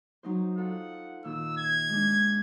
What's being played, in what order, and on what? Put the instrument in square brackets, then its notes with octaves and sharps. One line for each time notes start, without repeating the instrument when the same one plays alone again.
[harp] F#3 D#4 C5
[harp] F4 A4 [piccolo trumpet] F#5
[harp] A#2 D#3 F4 [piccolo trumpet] E6
[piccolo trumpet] G#6
[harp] G#3 D4